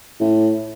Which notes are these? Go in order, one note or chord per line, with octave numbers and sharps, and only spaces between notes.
A2